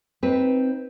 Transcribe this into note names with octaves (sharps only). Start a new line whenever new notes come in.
C4 D#4 B4